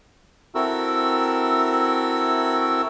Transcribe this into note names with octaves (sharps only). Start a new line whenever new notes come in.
C4 E4 F#4 A4 A#4 E6